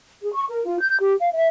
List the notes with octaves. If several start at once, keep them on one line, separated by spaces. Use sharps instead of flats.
G#4
C#6
A#4
F4
G6
G4
F5
E5